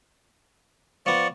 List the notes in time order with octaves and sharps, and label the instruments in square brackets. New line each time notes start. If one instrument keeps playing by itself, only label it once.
[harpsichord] F3 B3 [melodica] D5 C#6